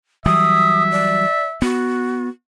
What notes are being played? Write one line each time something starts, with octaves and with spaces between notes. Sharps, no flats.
E3 F#3 G3 E5 D#6
D5
B3 F#4